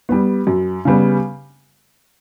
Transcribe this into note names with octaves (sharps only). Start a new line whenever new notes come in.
G3 B3
F#2
C#3 G3 B3